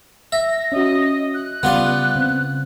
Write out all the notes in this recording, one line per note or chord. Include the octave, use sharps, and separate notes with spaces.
E5 A#6
C#4 F#4 D#5
F#6
C#3 G3 B3 F4 D5
C#3 C4